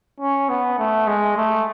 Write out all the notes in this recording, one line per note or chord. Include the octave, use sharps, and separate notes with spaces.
C#4
B3
A3
G#3
A3